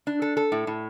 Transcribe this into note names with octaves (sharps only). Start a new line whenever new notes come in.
D4
A4
A4
A2
A2